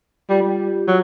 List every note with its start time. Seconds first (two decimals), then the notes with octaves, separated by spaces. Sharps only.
0.29 G3 F4 G4
0.42 G3
0.88 F#3